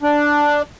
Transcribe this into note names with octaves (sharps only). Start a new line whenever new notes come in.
D4